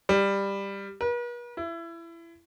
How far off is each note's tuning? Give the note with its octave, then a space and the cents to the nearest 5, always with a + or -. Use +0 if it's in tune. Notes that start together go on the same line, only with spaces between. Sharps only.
G3 +15
B4 -45
E4 +25